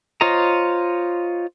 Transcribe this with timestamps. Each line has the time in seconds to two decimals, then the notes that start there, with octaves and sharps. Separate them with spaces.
0.21 F4 C5 C#5 D#5 A#5